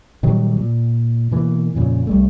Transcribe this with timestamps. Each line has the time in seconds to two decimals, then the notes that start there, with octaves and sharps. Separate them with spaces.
0.23 A#2 D#3 F#3 G3
0.57 A#2
1.31 B2 E3 A#3
1.75 F2 A#2 C#3
2.07 C2 G3 A3